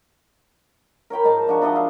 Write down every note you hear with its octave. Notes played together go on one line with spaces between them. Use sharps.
A#4 C#5 G5 B5
G#2 D#3 A5 A#5
F3 D4 F#4
D4 E4 D#5 F#5
E5 F5